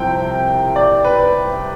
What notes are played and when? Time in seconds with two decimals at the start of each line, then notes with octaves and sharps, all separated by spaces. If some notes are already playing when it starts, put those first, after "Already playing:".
Already playing: C2 C3 F3 C4 G5
0.76 D5
1.05 B4